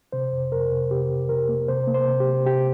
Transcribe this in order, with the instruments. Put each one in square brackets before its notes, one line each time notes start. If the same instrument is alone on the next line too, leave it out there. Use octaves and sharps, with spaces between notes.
[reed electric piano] C3 C5
F2
F2 A#4
C3
C3 G4
C3
C3 A#4
A#3
C3 C5
A#3
C5
C3
G4
C3
C3 G4